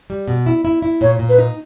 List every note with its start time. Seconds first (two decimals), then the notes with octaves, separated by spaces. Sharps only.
0.10 G3
0.28 B2
0.46 E4
0.65 E4
0.82 E4
1.01 A#2 C#5
1.19 A#2
1.29 B4
1.38 D#4